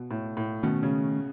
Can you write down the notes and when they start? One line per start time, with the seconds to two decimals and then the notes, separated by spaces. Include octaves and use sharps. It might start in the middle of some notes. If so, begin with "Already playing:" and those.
Already playing: B2
0.11 A2
0.37 A2
0.63 B2 D#3 A3 C#4
0.83 C#3